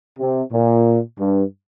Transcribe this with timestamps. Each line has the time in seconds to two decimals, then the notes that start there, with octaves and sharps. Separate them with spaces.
0.19 C3
0.52 A#2
1.20 G2